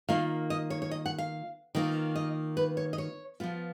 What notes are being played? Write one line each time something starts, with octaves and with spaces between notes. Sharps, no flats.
D#3 A#3 F4 F5
D#5
C#5
C#5
D#5
F#5
F5
D#3 A#3 F4
D#5
B4
C#5
D#5
C#5
F3 B3 F4